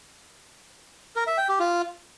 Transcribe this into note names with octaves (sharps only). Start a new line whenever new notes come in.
A#4
E5
G5
G4
F4